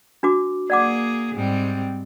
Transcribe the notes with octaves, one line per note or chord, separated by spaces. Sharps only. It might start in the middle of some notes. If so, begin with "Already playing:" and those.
D4 F#4 D6
A#3 G#4 D5 F#5 D6
G#2 G3 C4